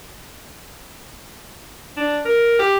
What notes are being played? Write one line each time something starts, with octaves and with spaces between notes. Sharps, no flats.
D4
A#4
G4